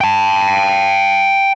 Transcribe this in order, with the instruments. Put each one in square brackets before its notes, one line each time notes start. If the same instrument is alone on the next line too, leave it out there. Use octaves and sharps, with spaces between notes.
[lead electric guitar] G5 A5